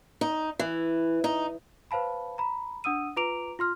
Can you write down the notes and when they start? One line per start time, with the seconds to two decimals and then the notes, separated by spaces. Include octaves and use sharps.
0.21 D#4
0.59 E3
1.24 D#4
1.91 B4 C5 F5 A5 B5
2.38 A#5 B5
2.84 D4 F#5 D#6 E6 D#7
3.16 F4 B4 A#5 D6 D7 F7
3.59 F4 C6 F6